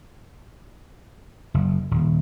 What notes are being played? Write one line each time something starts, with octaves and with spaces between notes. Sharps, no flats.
F#1
D#1